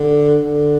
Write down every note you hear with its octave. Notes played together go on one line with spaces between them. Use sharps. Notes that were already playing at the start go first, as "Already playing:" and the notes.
Already playing: D3
D3